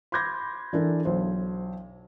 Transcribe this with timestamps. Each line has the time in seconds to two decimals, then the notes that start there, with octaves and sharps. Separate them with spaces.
0.12 B5 C6 D6 G6 G#6 A#6
0.73 E3 D4 E4 A4 A#4
1.05 B1 C5